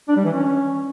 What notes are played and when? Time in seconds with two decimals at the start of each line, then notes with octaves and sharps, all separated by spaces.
0.08 D4
0.17 G3
0.25 E3
0.33 C#4